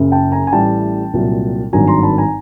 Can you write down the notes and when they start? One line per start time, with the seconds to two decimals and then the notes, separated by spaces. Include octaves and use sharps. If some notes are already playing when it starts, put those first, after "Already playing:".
Already playing: F#1 F#2 C#3
0.12 G5 A5
0.32 G#5 A#5
0.47 G#5
0.52 A1 A2 E3 G3 G5 A5
1.13 C2 A#2 F#3
1.73 G#1 G2 D#3 F#3 G#5 A#5
1.87 A#5 C6
2.03 A5 B5
2.18 G#5 A#5